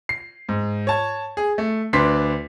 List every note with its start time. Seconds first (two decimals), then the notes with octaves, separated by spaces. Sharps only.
0.09 C7
0.49 G#2
0.87 C#5 A5 G#6
1.37 G#4
1.58 A3
1.93 D2 D4 B4 C6 B6 C7